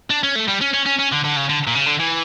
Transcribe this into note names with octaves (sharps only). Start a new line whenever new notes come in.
D4
C#4
A3
G3
C#4
C#4
C#4
C#4
D3
D3
C#3
D3
A#2
C#3
D3
E3